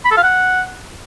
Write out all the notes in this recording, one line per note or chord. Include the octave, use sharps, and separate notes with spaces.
B5
A4
F5
F#5